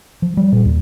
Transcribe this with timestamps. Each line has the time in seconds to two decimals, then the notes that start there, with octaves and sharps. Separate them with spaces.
0.22 F3
0.37 G3
0.52 A#2
0.65 D#2